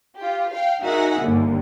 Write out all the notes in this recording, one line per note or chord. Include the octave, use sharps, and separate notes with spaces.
F4 G4
F5 G5
D#4 F#4 G#4 A#4 E5 F#5
G1 D#2 D3